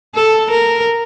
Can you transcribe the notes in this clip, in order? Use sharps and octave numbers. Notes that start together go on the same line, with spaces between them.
A4
A#4